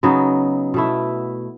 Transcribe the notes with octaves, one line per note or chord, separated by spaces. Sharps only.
C#3 F#3 B3 D#4
B2 A3 E4